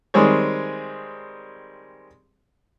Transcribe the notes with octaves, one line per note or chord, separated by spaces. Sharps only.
D#3 G3 G#3 C4 G#4 C#5